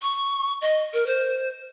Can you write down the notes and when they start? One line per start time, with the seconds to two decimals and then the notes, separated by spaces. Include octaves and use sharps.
0.02 C#6
0.61 D#5
0.93 A#4
1.07 C5